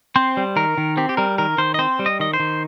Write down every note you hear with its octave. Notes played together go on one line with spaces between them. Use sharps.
C4 C5
G3
D#3 A#4
D#3
C4 G4
G4
G3 A#4
D#3 A#4
D#3 C5
D#5
C4 C5
G3
D#5
D#3 D#5
C5
D#3